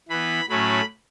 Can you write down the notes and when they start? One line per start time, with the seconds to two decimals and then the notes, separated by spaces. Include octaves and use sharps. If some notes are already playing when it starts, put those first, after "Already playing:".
0.09 E3 B3 B5
0.49 A2 F#3 A3 C#4 B5